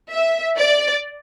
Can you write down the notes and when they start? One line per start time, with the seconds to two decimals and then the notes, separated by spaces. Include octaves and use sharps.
0.11 E5
0.58 D5